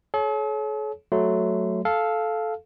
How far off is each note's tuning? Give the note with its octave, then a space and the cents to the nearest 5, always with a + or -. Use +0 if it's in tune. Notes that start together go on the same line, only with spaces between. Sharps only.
A4 -45 C#5 +0
F#3 +0 A3 -5 C6 -30
A4 -10 F5 +0